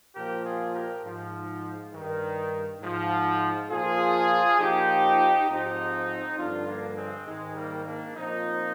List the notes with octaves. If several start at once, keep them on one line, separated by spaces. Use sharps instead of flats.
A#2 F3 G4 A#4
F4 G#4
G4 A#4
G#2 F3
G2 D#3
G#2 F3
A#2 F3 F4 G#4
A#2 F3 D#4 G4
G#2 F3 C4 D#4
G2 D3 F3 D4 F4
A#3 D4
G#3 C4
G#2 D#3 G#3
G3 A#3
A#3 D4
A#2 F3 C4 D#4